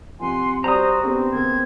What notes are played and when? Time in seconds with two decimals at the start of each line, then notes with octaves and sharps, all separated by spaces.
0.19 C3 F3 F#5 G#5 C6
0.64 G3 F#4 C5 D5 A#5 D#6
1.03 B3 C4 D4 G4
1.32 C#3 A#3 B3 G#6